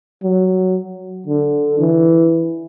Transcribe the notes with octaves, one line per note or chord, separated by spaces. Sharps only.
F#3
D3
E3